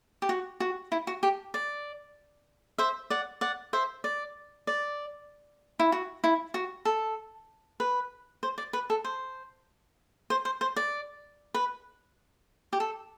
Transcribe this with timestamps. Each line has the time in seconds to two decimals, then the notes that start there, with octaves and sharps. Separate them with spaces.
0.22 G4
0.29 F#4
0.60 F#4
0.92 E4
1.07 F#4
1.23 G4
1.54 D5
2.78 C5 E5
3.10 D5 F#5
3.41 D5 F#5
3.73 C5 E5
4.04 D5
4.67 D5
5.79 E4
5.92 F#4
6.24 E4
6.54 F#4
6.85 A4
7.80 B4
8.43 C5
8.58 D5
8.73 B4
8.90 A4
9.04 C5
10.30 C5
10.45 C5
10.61 C5
10.76 D5
11.54 B4
12.73 G4
12.80 A4